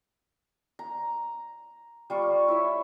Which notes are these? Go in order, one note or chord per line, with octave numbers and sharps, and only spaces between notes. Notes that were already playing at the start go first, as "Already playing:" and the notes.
A#5
G3 F4 C#6
E4 C#5 E5